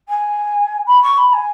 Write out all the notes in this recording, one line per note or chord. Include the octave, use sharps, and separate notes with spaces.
G#5
B5
C#6
B5
G#5